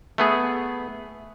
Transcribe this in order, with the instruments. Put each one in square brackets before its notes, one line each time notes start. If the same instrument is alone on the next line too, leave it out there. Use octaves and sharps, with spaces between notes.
[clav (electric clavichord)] A3 B3 G#4